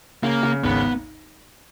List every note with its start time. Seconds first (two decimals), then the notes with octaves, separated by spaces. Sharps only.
0.23 C#3 A#3
0.43 C#3
0.64 G#1 B3